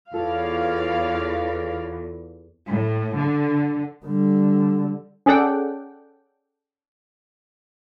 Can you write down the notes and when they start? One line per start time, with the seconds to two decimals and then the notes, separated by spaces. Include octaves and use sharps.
0.14 E2 F4 A4 C#5 D5 F5
2.70 A2
3.18 D3
4.05 D3 G3
5.26 C#4 G#4 A4 D5 F#5 G5